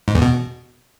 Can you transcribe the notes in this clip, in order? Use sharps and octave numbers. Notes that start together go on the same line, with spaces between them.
G#2
E2
B2